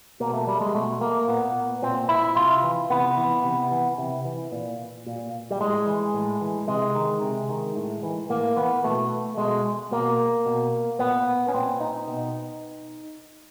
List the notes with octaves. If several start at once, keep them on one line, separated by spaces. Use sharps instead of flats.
B2 A#3
A3
G3
G#3
B2 A3
A#3
A#2 B3
A#2 C4
E4
C3 F4
E3
C3 B3
E3
C3
E3
C3
E3
A#2
A#2
G3
A2 G#3
E3
A2
E3
C3 G#3
D#3
C3
D#3
A2
E3
A2 A#3
E3 B3
B2 A3
B2 G#3
B2 A#3
B2
A#2 B3
C#4
A#2 C4
D#4
B2